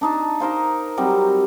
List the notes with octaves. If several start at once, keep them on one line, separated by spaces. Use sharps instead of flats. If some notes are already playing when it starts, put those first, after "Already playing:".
D4 D#4 A5
D#4 A#4 C5 F5
F#3 G3 C4 D#4